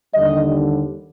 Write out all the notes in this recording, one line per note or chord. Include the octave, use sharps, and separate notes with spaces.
D#2 D3 G3 D#5